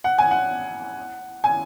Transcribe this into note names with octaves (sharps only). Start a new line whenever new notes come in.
F#5
G#5
F#5
G#5